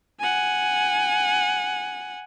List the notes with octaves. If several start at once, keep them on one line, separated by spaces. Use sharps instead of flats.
F#5 G#5